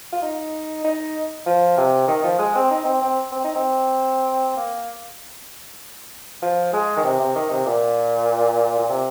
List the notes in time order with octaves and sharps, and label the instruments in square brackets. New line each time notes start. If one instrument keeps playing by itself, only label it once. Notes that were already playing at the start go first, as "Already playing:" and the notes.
[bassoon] F4
D#4
D#4
F3
C3
D#3
F3
G#3
C4
D#4
C4
C4
C4
D#4
C4
A#3
F3
G#3
D#3
C3
C3
D#3
C3
A#2
A#2
C3